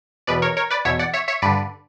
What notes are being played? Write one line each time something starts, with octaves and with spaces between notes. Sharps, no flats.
E2 B2 B4 D5
A#4 C#5
A#4 C#5
B4 D5
E2 B2 C#5 E5
D5 F#5
C#5 E5
C#5 E5
G2 D3 B4 D5